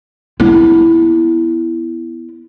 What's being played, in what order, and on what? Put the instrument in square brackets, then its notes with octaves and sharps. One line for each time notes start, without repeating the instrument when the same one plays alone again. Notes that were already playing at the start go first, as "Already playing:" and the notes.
[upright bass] B3 E4